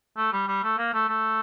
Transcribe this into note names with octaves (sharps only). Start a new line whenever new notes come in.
A3
G3
G3
A3
A#3
A3
A3